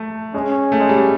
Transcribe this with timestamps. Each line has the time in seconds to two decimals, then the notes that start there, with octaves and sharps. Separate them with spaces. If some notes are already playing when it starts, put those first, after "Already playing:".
Already playing: A3
0.34 G#3 C#4
0.72 A3
0.80 G#3
0.89 G3